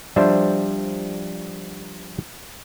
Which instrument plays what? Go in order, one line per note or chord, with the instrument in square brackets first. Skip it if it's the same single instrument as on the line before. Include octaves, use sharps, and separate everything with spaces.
[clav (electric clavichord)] F3 G3 D4 C5 E5